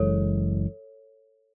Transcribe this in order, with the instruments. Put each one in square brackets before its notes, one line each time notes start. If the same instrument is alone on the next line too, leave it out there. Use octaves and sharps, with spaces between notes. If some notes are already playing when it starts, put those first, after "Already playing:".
Already playing: [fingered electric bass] F#1 F#2 E3 G#3 [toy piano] A4 C#5